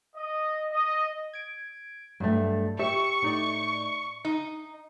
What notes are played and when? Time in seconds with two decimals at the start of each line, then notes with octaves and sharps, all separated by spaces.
0.15 D#5
0.71 D#5
1.33 G#6 D7
2.20 G2 F#3 A3
2.79 G4 E5 C#6
3.22 A2 D#4 D5
4.25 D#4